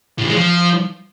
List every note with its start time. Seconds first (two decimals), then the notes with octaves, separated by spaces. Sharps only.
0.19 A2
0.24 E3
0.29 G#3
0.34 F3